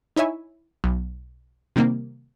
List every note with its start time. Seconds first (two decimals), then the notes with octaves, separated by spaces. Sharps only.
0.16 D#4 E4 C#5 E5 G#5
0.84 B1
1.76 C3 D#3 G3 A#3 C4